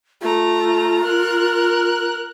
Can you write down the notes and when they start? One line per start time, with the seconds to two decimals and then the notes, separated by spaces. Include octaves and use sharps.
0.22 A3 F4 A#5
1.05 A#4 F#6